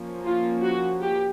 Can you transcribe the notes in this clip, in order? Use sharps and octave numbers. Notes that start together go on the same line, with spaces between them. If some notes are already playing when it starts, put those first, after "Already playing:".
Already playing: F3 A#3 C#4
F4
F#4
G4